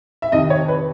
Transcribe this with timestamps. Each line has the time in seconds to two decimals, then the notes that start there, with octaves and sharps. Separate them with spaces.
0.22 E5
0.31 F2 C3 D#3 D#5
0.50 C#5
0.68 B4